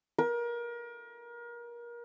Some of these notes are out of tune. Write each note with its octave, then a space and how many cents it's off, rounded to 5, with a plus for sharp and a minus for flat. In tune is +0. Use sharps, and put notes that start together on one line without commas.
A#4 +30